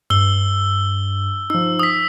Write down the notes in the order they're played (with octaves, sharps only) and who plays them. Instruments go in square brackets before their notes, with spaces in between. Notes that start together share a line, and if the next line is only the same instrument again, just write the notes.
[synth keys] G2 [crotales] E6 G7
[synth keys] F3 D#4 [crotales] E6
[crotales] D#6 B6